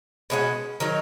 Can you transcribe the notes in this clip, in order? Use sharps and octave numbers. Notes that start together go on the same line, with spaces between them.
B2 G#3 C#4 F#4
D#3 F#3 D#4